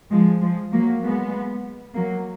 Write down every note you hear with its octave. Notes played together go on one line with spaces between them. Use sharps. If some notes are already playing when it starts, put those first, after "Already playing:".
F3 G#3
F3 G#3
F#3 A#3
G#3 B3
F#3 A#3